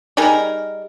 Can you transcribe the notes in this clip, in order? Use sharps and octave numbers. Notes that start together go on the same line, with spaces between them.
G3 D#4 G#4 A#4